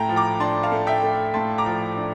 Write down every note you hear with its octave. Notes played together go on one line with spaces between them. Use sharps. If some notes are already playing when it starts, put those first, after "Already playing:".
Already playing: A2 A3 G5 A5 A#5
F3
A#5 D6
D4 A5 C6
F5 A5
A3
E5 G5
A3
A2 A5 C6
A#5 D6
F3
D4